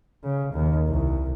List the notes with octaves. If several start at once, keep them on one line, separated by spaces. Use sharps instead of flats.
C#3
D#2
C2